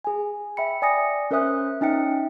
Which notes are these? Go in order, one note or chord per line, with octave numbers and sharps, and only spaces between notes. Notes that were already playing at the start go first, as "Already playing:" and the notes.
G#4 G#5
E5 G5 B5 C#7
D5 G#5 D#6 A#6 C#7
C#4 A#4 C5 E5 D#6 F#6
C#4 D#4 E5 G5 C#7